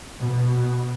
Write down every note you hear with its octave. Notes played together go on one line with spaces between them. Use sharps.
B2